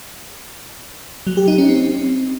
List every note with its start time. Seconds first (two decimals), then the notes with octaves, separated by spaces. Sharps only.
1.27 F#3
1.37 G4
1.48 D#4
1.58 C#4
1.69 C4